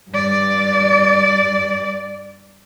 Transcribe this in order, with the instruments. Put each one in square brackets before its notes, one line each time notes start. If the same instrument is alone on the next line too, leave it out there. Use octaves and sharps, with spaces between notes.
[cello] G2 D5